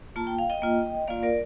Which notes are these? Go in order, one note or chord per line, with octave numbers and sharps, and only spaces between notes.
A#3 F4 A5
G5
F5
D#5 G5
A#3 F4
A#3 F4 D5 F5
A#4 D5